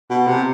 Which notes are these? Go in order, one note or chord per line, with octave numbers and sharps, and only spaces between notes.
B2
C3